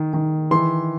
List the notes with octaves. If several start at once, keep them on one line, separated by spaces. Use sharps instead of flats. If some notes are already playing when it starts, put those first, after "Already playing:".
Already playing: D#3
D#3
E3 C6